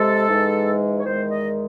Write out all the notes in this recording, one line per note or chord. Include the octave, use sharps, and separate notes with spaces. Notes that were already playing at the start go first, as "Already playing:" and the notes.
Already playing: C3 G#3 A4
G#2 E3 G#3
C#5
E2 D#3 G#3 C5
D#5